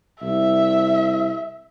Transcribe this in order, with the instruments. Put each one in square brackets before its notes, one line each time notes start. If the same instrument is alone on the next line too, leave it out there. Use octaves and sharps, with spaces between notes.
[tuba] C2 [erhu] E5